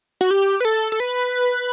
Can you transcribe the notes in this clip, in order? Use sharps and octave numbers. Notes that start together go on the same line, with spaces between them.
F#4
G4
B4
A4
A4
B4